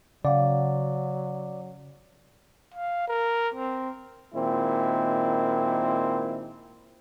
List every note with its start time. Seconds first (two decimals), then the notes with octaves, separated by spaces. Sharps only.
0.25 C#3 F#3 D5 F5 F#5
2.74 F5
3.08 A#4
3.54 C4
4.34 A#2 D#3 G#3 C4 E4